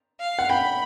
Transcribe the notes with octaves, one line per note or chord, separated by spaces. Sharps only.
F5
F#5
G5 B5